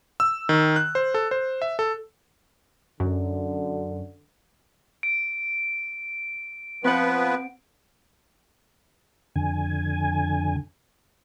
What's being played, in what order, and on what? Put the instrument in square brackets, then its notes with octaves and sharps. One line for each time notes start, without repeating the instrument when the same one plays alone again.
[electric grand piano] E6
D#3
F#6
C5
A4
C5
E5
A4
[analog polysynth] F#2 [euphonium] D3
[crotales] D7
[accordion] F3 B3 B4 [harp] C4 F#5
[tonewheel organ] F2 D3 G#5